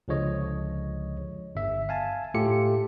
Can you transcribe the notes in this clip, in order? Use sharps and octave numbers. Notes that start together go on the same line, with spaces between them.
C#2 D3 F3 G#3 C#5 D#5
G1 E5
F5 G#5 A5
A2 A3 F4 G4 A4 C#7